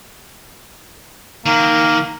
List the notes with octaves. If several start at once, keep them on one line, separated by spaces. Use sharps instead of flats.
D#3 A#3